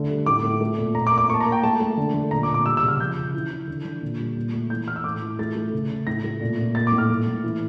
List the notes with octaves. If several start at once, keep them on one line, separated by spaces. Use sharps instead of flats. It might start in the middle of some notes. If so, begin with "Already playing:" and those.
Already playing: D3 A3
G3
A2 D6
A2
A3
A#2
A#2 A#5
D6
A#3
D6
A#3 C#6
A5
A#5
A#3
G5
A3 A5
A3
D3
D3
A#2 A#5
D6
A#2
D6
G3 E6
E6
C#3
F6
F3 G6
C#3
E3
E3
D3
D3
A#2
G3
A#2
A3
E3 G6
E3 F6
E6
A2 D6
E3
A3 A6
A3
C#3
C#3
A2 A#6
A3
A#2
A#2
A#3 A6
D6
A2
F6
A2
A2
E3